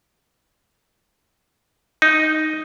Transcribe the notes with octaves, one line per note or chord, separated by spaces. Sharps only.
D#4